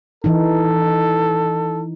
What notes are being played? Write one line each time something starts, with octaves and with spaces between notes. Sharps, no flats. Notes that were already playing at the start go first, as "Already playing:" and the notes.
E3 D#4 A4